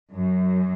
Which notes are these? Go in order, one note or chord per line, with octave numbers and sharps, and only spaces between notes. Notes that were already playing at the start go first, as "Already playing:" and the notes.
F#2